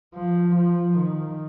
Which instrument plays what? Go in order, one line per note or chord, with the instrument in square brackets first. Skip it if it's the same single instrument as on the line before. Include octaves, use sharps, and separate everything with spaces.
[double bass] F3
F3
D#3